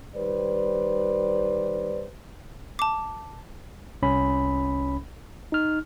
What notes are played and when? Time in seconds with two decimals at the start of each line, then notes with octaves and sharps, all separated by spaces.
0.16 D#3 G3 B4 C5 D5
2.79 A5 D6
4.02 C2 C#4 B5
5.52 D#4 F6